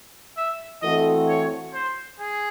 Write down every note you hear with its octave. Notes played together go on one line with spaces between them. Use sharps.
E5
E3 A3 C4 F#4 A4 D#5
C#5
C5
G#4